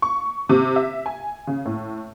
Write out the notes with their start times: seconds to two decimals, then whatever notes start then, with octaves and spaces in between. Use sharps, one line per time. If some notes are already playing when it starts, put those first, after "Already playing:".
0.02 C#6
0.49 C3
0.76 E5
1.06 G#5
1.47 C#3
1.65 A2